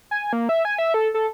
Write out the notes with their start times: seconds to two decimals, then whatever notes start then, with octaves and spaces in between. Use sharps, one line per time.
0.11 G#5
0.33 A#3
0.49 E5
0.65 G#5
0.78 E5
0.94 A4
1.14 A4